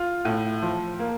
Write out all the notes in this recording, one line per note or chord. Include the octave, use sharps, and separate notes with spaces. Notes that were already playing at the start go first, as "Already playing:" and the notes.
Already playing: F4
A2
F3
A#3